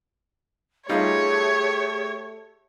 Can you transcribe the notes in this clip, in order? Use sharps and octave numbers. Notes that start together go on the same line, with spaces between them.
G3 A3 D#4 F4 G4 G#4 C#5